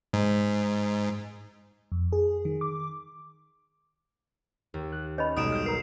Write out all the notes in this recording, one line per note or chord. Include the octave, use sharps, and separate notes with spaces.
G#2
F2
G#4
D#3
D6
D#2
F#6
C#4 C#5 D#5 B5
B1 G#2 G3 D#4 D#6 D7 E7
E6 F6 G6
A#4 A#5 C7